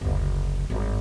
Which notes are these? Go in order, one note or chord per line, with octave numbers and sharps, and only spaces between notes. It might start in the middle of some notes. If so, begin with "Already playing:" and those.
F#1 D2
G#1 G2